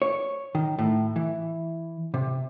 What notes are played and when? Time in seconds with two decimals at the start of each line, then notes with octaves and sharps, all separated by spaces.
0.02 C#5
0.55 D#3
0.78 A2
1.16 E3
2.14 C3